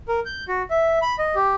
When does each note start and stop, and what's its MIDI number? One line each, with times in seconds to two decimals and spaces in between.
0.08 0.20 70
0.26 0.44 91
0.48 0.62 66
0.71 0.99 76
1.02 1.15 83
1.19 1.35 75
1.35 1.55 67